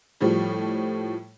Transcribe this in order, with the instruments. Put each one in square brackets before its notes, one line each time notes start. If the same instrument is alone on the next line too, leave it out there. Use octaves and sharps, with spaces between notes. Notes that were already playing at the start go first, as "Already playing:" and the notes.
[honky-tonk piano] A2 F3 G3